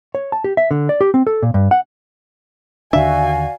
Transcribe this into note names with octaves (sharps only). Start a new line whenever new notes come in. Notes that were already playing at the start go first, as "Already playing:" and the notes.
C#5
A5
G4
E5
D3
D5
G4
C4
A4
A#2
G2
F#5
D#2 D3 D4 F#4 D5 E5 F5 G#5